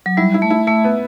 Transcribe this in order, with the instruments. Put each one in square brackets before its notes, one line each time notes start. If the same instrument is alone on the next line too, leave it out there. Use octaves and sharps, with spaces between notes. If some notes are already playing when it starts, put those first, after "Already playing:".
[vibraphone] F#3
[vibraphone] G3 [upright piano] E4
[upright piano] E4
[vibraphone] A3
[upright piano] E4
[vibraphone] A3 [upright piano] E5
[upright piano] B3